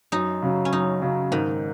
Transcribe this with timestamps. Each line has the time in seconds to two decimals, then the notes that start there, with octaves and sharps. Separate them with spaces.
0.12 F#2 D#4
0.42 C#3 F#3
0.65 C#4
0.73 F#2 D#4
1.02 C#3 F#3
1.32 G#2 D#3